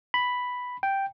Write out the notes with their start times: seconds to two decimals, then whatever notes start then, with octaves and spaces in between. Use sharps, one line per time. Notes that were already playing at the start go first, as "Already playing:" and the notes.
0.14 B5
0.83 G5